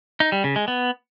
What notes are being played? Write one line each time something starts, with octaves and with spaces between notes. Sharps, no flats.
D#4
G3
C#3
G#3
B3